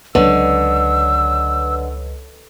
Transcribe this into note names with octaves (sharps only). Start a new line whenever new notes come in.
C#2 D3 F#3 B4 C#5 D#5 E6